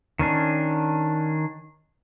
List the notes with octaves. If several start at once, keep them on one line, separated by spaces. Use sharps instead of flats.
D#3 C#4 D4